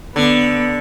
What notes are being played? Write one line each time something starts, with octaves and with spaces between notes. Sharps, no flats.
D3 B3